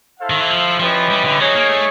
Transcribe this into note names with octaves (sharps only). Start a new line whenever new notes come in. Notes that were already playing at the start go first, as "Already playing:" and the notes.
E4 A4 C5 F5
D#3
E3
F3
F3 C#4 E4 G4 B4 D#5
G3
D3
F#3 D#4 G#4 C#5
A#3
A3